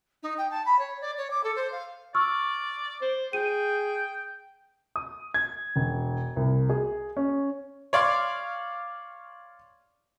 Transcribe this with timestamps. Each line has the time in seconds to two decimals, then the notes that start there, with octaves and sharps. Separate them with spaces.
0.23 D#4
0.38 G5
0.51 A5
0.66 B5
0.79 C#5
1.01 D5
1.18 C#5
1.31 D6
1.44 A4
1.56 C5
1.72 F5
2.15 D5 C#6 E6 F6
3.01 C5
3.33 G#4 G5 D#7
4.96 D#6
5.34 G#6
5.76 E1
6.37 C2
6.70 G#4
7.17 C#4
7.93 C#5 D5 F5 C6